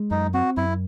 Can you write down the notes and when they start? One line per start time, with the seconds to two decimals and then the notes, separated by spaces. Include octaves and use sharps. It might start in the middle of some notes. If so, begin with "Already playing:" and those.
Already playing: G#3
0.11 F#2 D#4
0.34 C4 F#4
0.57 F#2 E4